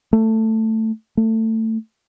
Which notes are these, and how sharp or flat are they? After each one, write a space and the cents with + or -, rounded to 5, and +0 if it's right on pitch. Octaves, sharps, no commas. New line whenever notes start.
A3 +10
A3 +20